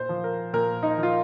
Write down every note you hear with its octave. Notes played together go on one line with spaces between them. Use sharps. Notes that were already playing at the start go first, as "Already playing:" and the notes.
Already playing: A#2 C5
F3
A#4
A#2 A#4
D#4
F3
F4